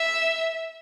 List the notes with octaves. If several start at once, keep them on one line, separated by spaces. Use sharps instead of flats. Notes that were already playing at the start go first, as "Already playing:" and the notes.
Already playing: E5